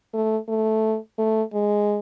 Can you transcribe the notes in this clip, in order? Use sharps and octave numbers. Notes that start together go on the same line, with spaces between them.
A3
A3
A3
G#3